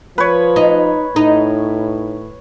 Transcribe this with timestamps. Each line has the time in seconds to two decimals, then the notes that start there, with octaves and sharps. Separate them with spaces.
0.18 F3 B4 C#5
0.56 D#4
1.16 A2 D#4